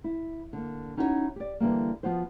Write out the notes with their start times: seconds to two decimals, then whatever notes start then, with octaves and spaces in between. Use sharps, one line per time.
0.04 E4
0.53 D3 A#3
0.97 C#4 D#4 E4 F#4 A#4 C#5
1.36 G4 D5
1.60 D3 E3 G3 A#3
2.03 F3 B3 F4 F#4 C5